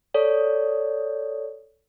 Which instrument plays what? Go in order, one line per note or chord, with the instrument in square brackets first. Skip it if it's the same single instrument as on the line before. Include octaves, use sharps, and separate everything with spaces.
[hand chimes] A4 C#5 D5